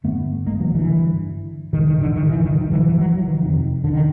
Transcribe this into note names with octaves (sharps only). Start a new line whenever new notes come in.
G2 D3 A3 B3
G#3 A#3
E3 F#3
D3 E3
G2 D3
G#2 D#3
D#3
D3
D#3
D3 E3
D#3 F3
G2 D3 D#3
E3 F#3
E3 F#3
E3 F#3
E3 F#3
D#3 F3
F2 C3 D#3
D3
D#3